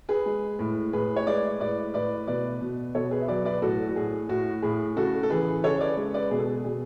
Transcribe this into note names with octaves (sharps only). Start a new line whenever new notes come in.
G#4 B4
G#3
A2
A2 G#4 B4
C#5
G#3 B4 D5
A2 B4 D5
A2 B4 D5
B2 B4 D5
B2
B2 A4 C#5
G#4 B4
E5
F#3 B4 D5
B4 D5
A2 F#4 A4
F#4
A2 G#4
A2 F#4
A2 G#4
C#3 F#4 A4
A4
E3 G#4 B4
C#3 A4 C#5
B4 D5
G#3
B4 D5
B2 G#4
A4
G#4
B2 G#4